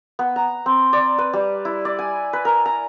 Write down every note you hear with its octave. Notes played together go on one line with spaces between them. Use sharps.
B3
A#5
C4
D5
B4
G3
E4
D5
G#5
B4
A#4
A#5